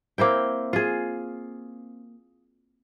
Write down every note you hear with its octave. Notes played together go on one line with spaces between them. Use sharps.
A#3 C4 E4 G5
F4 G#4